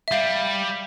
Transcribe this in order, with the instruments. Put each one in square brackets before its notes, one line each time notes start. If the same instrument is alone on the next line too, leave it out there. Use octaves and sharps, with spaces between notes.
[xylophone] E5
[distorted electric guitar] G3 [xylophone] F5